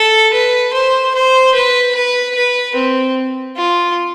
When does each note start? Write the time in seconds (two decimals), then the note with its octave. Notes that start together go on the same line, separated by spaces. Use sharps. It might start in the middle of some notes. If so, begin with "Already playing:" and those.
Already playing: A4
0.33 B4
0.74 C5
1.15 C5
1.55 B4
1.95 B4
2.35 B4
2.76 C4
3.57 F4